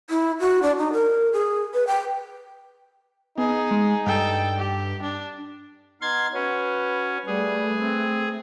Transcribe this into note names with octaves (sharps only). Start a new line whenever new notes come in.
E4
F#4
D4
D#4
A#4
G#4
B4
G5
B3 D#4 G#4
G#3
G2 A4 G5
G4
D4
B3 D#4 C6 F6 G#6 A6
C#4 F#4 B4 C#5
G3 A3 G#4 B4
C4